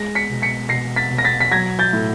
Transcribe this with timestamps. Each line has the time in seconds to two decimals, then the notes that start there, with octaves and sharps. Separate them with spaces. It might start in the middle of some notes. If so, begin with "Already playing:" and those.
Already playing: G#3 A#6
0.15 B6 C#7
0.29 B2
0.42 B6 C#7
0.69 B2 A#6 C7
0.96 A6 B6
1.11 B2
1.18 A#6
1.24 A6 B6
1.40 B6
1.51 F#3 G#6 A#6
1.79 G6 A6
1.93 A2